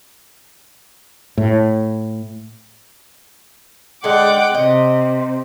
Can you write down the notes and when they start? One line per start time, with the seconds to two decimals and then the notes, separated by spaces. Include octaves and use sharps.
1.37 A2
4.04 D3 G#3 F#5 G5 D6
4.55 C3 D#5